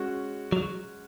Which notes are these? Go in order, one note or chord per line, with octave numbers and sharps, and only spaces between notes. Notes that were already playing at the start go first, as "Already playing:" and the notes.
Already playing: G#3 C#4 F#4
F#3